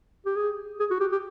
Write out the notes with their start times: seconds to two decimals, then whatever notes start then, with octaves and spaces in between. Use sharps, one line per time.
0.26 G4
0.36 G#4
0.80 G#4
0.91 F#4
1.00 G4
1.12 G4